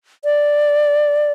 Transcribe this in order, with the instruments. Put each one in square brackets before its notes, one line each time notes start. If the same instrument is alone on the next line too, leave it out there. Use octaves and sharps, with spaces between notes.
[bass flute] D5